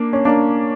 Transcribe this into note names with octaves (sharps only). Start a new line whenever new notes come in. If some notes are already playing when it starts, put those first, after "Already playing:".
Already playing: A#3 D4
C#4
A#3 D4